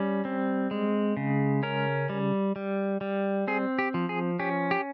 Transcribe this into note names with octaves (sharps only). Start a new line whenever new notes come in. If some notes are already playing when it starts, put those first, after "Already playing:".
Already playing: G3 C#4
C4
G#3
C#3
C#4 A#4
G3
G3
G3
C4 G#4
G4
F3
G#4
C#4 G4
G4